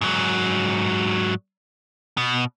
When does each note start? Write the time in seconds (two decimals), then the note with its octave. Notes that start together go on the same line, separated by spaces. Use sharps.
0.01 G#2 F#3
2.17 B2